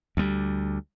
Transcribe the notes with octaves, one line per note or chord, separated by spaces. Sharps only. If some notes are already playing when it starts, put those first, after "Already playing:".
D2 G3